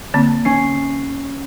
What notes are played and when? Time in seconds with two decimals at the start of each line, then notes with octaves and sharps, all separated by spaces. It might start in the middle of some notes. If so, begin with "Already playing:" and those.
0.14 D3 A#3 C4
0.45 C#4 C7